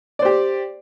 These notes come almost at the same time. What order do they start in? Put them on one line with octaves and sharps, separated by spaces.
D5 C5 G4